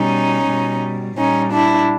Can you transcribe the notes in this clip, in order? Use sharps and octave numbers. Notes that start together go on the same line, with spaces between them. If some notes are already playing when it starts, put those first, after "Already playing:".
Already playing: B2 G3 C#4 D#4
B2 G3
A#2 G3 C#4 D#4
D4 E4